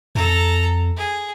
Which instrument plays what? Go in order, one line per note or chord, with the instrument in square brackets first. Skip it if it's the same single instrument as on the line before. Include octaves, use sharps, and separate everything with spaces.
[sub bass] F2 [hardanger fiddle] A4 A#5
[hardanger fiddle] G#4